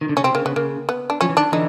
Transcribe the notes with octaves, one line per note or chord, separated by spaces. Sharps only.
D#3
D3
C#3 C#4
C3 C4
C#3 A#3
C#3 B3
C#3 A#3
B3
D4
F3 C#4
E3
D#3 D4
D3 E3 D#4